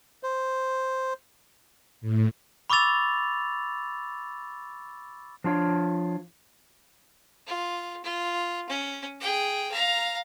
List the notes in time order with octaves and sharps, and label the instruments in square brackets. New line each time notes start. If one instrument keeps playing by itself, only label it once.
[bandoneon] C5
[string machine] A2
[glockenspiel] B5 C#6 D6 E6 A6 F7
[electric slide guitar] F3 D4 F4 C#5
[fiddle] F4
F4
C#4
G#4 G5
F5 A#5